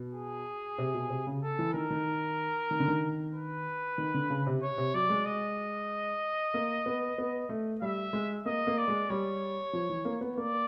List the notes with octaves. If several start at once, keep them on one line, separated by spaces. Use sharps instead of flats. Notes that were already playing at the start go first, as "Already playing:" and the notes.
Already playing: B2
G#4
C3
B2
C3
C#3
A4
E3
D#3 A#4
D#3
D#3
D3
D#3
B4
D#3
D3
C#3
C3
C#5
C3
F#3 D5
G#3
D#5
A#3
B3
B3
A3
G3 E5
G#3
A#3 D#5
A#3
D5
G#3
G3 C#5
F3
E3
A#3
B3
A#3 D5